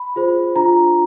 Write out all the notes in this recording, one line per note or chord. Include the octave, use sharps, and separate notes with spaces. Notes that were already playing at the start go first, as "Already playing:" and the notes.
Already playing: B5
F4 G#4 C5
D4 F4 A#5